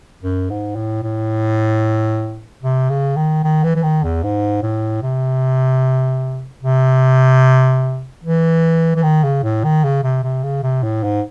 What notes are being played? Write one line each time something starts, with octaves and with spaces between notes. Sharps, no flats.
F#2
G#2
A2
A2
C3
C#3
D#3
D#3
E3
E3
D#3
E2
G#2
A2
C3
C3
E3
E3
D#3
C#3
A2
D#3
C#3
C3
C3
C#3
C3
A2
G#2